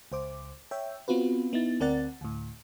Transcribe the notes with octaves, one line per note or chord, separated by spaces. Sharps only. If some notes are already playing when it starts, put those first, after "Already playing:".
C#2 C5 D6
C#5 E5 G5
B3 C4 F4 F#4 B4
B3 D#4 E4 A6
D2 C4 A#4 D5 F#5 A6
D2 A2